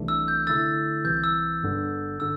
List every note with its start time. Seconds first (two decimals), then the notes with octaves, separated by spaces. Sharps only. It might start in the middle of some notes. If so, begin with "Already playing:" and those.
Already playing: C2 C3 E3 A3 D4
0.08 E6
0.28 G6
0.47 D3 A3 E4 A4 E6 A6
1.04 C2 C3 E3 G6
1.24 E6
1.62 G1 G2 D3
2.20 D3 E6